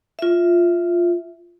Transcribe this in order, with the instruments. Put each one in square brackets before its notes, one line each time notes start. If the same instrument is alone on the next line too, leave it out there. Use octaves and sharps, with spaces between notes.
[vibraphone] F4 E5